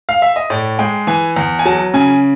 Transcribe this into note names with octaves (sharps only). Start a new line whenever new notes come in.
F5
E5
D#5
A2 D5
G#3 G5
E3 G#5
E2
G#5
F#3 A5
C#3 G#5